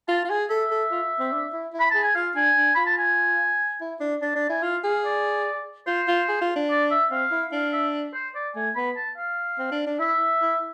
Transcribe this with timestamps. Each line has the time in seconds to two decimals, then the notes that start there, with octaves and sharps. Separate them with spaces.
0.09 F4 A5
0.24 F4
0.29 G#4 G#5
0.50 A4 E5
0.71 A4
0.92 F4
1.19 C4
1.32 D4
1.53 E4
1.73 E4
1.80 B5
1.91 G#4 A5
2.03 G#5
2.15 F4 F5
2.35 D4 G#5
2.57 D4
2.75 F4 B5
2.87 A5
2.98 G#5
3.81 E4
4.01 D4
4.22 D4 A5
4.36 D4 A5
4.49 E4 G#5
4.63 F4 F5
4.84 G#4 F5
5.05 D5
5.87 F4 C5
6.08 F4
6.29 G#4
6.42 F4
6.56 D4
6.70 D5
6.91 E5
7.11 C4 F5
7.31 E4
7.52 D4 F5
7.73 E5
8.14 C5
8.35 D5
8.56 A3 G#5
8.76 B3 B5
8.96 A5
9.17 F5
9.59 C4
9.72 D4
9.87 D4
9.99 E4 E5
10.42 E4